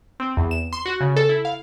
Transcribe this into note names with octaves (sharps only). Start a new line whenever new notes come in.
C4
E2
E7
C6
F#4
C#3
A4
E4
F5